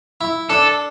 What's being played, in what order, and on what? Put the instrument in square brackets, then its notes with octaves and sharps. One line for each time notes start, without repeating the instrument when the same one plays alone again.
[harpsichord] E4
[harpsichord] D4 [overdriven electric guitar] A4